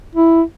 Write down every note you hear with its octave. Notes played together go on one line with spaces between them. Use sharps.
E4